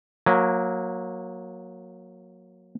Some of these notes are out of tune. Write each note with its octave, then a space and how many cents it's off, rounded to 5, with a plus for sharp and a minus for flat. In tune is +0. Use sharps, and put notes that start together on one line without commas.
F#3 -20 A#3 +0 G#5 +0